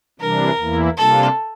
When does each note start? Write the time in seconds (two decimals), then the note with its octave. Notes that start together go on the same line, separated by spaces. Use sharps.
0.19 C3 E3 G3 D4 A#4
0.58 E2 E3 A#3 E4
0.97 C3 G3 A#3 D4 F4 A4